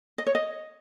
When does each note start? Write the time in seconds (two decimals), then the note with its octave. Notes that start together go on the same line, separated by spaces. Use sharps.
0.18 D#5
0.27 C#5
0.35 D#5